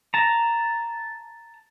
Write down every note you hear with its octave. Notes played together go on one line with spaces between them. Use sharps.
A5 A#5